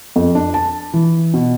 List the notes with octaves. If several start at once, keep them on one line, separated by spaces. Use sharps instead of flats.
F2
D4
A5
E3
B2